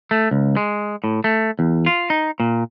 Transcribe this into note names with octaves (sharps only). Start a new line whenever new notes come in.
A3
C#2
G#3
A2
A3
E2
F4
D#4
A#2